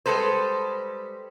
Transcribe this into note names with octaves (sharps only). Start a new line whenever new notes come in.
G3 G#3 A4 B4 C5